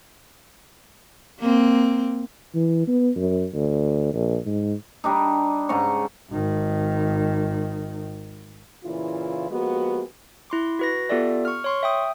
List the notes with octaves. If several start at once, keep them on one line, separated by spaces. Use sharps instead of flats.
A#3 C4
E3
B3
F#2
D2
A#1
G#2
G3 D4 D#4
G#2 C#3 A#5 C#6
G#1 D#3
A#2 C#3 E3 E4 F4
F3 G#3 A#3 B3 F#4 G4
E4 C6 D6
F#4 B4 A#6
B3 F4 G4 A4 D5 E5
C#6 F6
C#5 C6 C#6
E5 G5 D#6